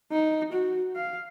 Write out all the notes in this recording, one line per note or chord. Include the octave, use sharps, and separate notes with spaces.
D#4
F#4
F5